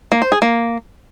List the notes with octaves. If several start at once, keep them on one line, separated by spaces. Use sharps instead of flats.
A#3
C5
G#4
A#3